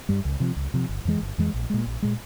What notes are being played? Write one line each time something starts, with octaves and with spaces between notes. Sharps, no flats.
G2 G3
C#2
C3 F3
C#2
C3 F3
G1
F2 E3 G#3
G1
F2 E3 G#3
A#1
A#2 G#3
A#1
A#2 G#3